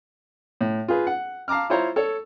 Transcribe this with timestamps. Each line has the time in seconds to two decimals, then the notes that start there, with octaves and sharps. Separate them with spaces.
0.61 A2
0.88 F4 G#4 B4
1.07 F#5
1.48 F5 A5 A#5 D6 F6
1.70 E4 F4 C5 C#5 A#5
1.96 A4 C#5